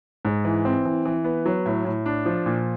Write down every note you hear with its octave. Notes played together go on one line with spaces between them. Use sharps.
G#2
E3
C4
E3
E3
B3
F#3
A2
A2
D4
F3
A#2